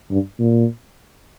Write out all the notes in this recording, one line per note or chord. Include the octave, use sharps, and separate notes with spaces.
G2
A#2